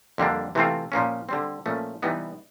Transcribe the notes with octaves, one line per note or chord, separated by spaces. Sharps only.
F2 D3 G3 A#3 D4
C3 E3 A3 C4 F4
A#2 F3 A#3 C#4
D3 G3 C4
A#2 F3 A3 C#4
C3 E3 G3 B3 D#4